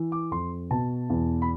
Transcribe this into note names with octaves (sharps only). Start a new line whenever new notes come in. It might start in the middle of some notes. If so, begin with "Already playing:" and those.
Already playing: E3
D6
F2 C6
B2 A5
E2
B5